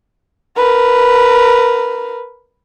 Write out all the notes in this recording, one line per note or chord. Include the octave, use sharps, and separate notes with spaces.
A#4 B4